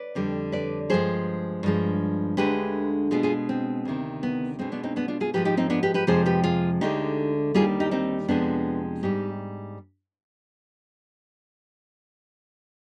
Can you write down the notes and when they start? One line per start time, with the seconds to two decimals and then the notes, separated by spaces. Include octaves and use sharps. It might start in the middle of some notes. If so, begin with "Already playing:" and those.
Already playing: B4 D5
0.15 F2 D3 G3
0.52 B4 D5
0.90 G2 F3 G#3 G#4 C5
1.63 G2 F3 G#3
2.37 D2 D3 G#3 G4 B4
3.11 B2 G#3 F4 G#4
3.23 F4 G#4
3.49 C4
3.85 D2 C3 D#3
4.23 B3
4.59 B2 G#3 C4
4.72 B3 D4
4.83 C4 D#4
4.96 B3 D4
5.08 D4 F4
5.20 F4 G#4
5.34 G#2 F3 G#3 G4 B4
5.45 D#4 G4
5.57 C4 D#4
5.70 B3 D4
5.83 G4 B4
5.94 G4 B4
6.07 F2 C3 F3 G#3 G#4 C5
6.26 G4 B4
6.44 F4 G#4
6.81 D2 D3 G#3 D#4 G4
7.54 D#2 D#3 G3 F4 G#4
7.80 D#4 G4
7.91 C4 D#4
8.28 F2 C3 F3 G#3 B3 D4
9.03 G#2 G3 D#4 G4